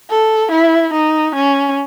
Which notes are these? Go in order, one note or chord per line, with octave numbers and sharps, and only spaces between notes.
A4
E4
D#4
C#4